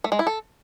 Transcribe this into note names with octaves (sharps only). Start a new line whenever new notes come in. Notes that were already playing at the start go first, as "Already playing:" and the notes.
A3
G#3
E4
A4